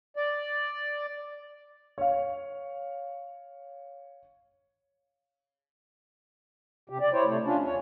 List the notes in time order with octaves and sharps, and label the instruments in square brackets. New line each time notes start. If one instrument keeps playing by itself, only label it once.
[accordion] D5
[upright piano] C#5 F5
[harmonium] C3 G4
D5
E4 C5 C#5
C3 A3
C#4 D4 F4
E2 C#5